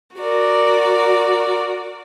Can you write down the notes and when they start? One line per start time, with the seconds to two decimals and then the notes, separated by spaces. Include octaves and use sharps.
0.16 F#4 A#4 D5